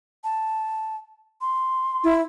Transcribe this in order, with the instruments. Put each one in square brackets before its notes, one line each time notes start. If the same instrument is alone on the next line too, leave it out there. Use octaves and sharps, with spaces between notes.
[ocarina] A5
C6
[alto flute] E4